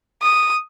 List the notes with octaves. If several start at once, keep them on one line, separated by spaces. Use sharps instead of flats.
D#6